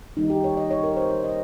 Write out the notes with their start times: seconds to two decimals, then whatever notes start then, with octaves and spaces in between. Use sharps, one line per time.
0.17 D#3 G3 A#3 D#4
0.30 G4
0.44 C#5
0.57 D#5
0.71 C#5
0.84 A#4
0.97 C5
1.11 C#5
1.24 D#5